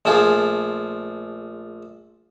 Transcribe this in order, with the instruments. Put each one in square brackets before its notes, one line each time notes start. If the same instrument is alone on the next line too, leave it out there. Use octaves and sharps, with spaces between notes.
[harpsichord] A#1 F3 A3 F4 G#4